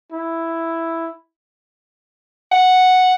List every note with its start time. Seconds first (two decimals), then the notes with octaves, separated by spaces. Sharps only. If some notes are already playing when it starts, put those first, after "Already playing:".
0.12 E4
2.52 F#5